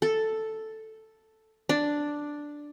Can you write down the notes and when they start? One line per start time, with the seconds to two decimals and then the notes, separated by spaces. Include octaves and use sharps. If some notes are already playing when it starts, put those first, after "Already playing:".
0.02 A4
1.69 D4